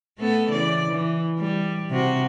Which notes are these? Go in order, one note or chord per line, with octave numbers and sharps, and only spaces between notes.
A3 B3 A4
C#3 E3 D5
E3
G3
C3 F#4